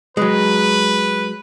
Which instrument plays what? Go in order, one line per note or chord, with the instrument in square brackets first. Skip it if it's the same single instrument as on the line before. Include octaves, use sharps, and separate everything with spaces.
[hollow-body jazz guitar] F#3 G#3 [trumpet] B4